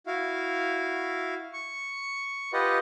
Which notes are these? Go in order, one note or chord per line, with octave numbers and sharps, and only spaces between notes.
E4 F#4 F5
C#6
F4 G4 B4 D#5 F#5